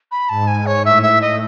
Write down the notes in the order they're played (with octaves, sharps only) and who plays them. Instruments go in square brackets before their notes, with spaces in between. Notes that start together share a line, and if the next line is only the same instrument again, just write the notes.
[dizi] B5
[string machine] G#2 [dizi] A5
[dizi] G#5
C#5
[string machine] A2 [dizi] E5
[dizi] E5
D#5